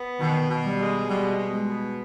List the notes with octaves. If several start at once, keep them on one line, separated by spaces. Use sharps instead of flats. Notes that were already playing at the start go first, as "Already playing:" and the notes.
Already playing: B3
B2 D#3
B2
G3
G#3
B2 G3
B2
G#3
B3